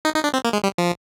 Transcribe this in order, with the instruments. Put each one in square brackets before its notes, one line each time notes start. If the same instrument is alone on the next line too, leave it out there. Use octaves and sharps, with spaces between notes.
[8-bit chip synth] D#4
D#4
D4
C4
A#3
G#3
G3
F3